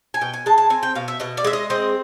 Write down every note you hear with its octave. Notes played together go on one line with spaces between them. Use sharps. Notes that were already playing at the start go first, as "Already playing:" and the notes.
G#5
B2 G5
G#5
G#3 A5
A5
C4 G#5
G5
B2 F5
E5
B2 D#5
D5
G#3 E5
D#5
C4 D#5